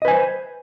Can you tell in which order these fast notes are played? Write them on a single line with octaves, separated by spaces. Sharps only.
D#5 B4 G#5 C5